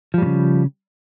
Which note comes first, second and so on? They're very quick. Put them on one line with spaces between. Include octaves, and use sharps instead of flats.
F3 G3 A2 C#3